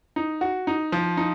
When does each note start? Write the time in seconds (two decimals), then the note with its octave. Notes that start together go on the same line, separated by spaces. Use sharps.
0.16 D#4
0.41 F#4
0.67 D#4
0.92 F3
1.17 D#4